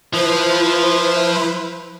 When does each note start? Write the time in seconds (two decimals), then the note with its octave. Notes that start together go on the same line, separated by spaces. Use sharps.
0.13 F3 E4 B4 C5